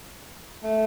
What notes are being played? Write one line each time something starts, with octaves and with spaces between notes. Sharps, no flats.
A3